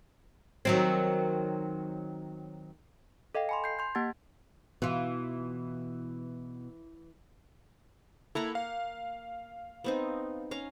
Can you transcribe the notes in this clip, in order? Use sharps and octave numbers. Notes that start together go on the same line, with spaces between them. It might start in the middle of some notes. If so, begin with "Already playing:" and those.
D#3 F#3 C4
A4 D#5 F5 G5
G#5 B5 C6
G6 C7
C6 G6
A#3 G4 F#5 A5 G#6 A6
B2 E3 F4
A#3 E4 A4 F#5 A#5
F5
B3 C4 D#4
C#4 F5 A#5